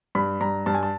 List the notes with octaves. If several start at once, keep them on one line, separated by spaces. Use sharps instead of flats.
G2 B5
G2 A#5
G2 A5
G#5
A5